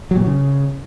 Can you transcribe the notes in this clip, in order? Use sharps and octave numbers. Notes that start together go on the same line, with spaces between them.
F#3
A#2
F#3
C#3